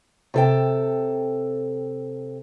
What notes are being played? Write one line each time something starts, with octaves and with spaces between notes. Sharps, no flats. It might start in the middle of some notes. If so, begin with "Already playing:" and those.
C3 A4 G5